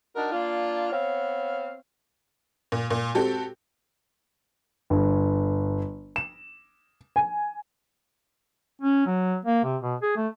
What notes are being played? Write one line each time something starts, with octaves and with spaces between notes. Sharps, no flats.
D4 D#4 F#4 A#4
A#3 D4 F4
B3 C4 C#5 F5
A#2
A#2
C4 F#4 G4 A4
G1
E7
G#5
C#4
F#3
A#3
C3
B2
G#4
A3